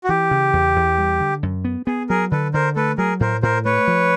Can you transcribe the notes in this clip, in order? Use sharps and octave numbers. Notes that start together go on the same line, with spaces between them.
F#4
E3 G4
C#3
E2
E2
G3
D3
F#2
B3
B3 G#4
F#3 G#4 A#4
D3 A4 B4
D3 A#4 C5
A3 A4 B4
F#3 G#4 A#4
A2 A#4 C5
A2 A#4 C5
A3 B4 C#5
F3